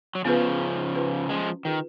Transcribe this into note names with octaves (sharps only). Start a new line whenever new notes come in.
F#3
C#3 F3 B3 F4 G#4 B4
C#4
F4 G#4 B4
F3 G#3 C#4
D#3 F4 G#4 B4